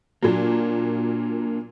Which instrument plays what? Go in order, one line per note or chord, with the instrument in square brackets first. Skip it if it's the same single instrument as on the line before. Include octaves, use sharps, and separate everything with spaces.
[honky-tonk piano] A#2 F#3 [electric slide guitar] A#3 D4